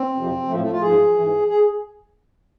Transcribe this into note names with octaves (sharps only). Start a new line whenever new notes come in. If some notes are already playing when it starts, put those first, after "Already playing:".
Already playing: C4
F2 C3 F3
A2 F3 A3
A3
F4
G#2 F3 G#4
E3
G#2
G#4